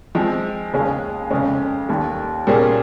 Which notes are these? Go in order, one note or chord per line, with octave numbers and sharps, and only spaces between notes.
F3 G#3 C4
D#2 C#3 G#3 C#4 G#4
F2 C#3 G#3 C#4
D#2 D#3 G3
A#2 G3 A#3 C#4 G#4